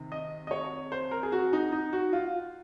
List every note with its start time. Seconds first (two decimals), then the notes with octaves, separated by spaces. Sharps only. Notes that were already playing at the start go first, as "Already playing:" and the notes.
Already playing: C3 D#3
0.12 D#5
0.47 D#5
0.51 C#5
0.92 C5
1.11 A#4
1.23 G#4
1.32 F#4
1.53 D#4
1.72 D#4
1.93 F#4
2.13 F4